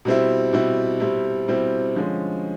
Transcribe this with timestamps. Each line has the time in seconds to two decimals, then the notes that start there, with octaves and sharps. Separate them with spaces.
0.05 B2 G3 C4 E4
0.53 B2 G3 C4 E4
1.00 B2 G3 C4 E4
1.48 B2 G3 C4 E4
1.95 D3 F3 G#3 C#4